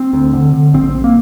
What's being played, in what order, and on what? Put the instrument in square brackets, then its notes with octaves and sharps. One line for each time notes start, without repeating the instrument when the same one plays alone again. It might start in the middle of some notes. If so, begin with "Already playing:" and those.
Already playing: [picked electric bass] C4
D2
D3
D3
A#1 C4
C4
A#1 C4
A#3